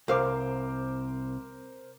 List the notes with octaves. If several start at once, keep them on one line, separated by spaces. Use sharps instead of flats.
C2 A#4 C5 F5 D6